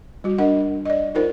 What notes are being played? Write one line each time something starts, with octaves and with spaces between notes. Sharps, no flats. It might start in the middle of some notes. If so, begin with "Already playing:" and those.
G3 F#4
D4 A#4 D#5 F#5
D5 D#5
D#4 F4 A#4 C5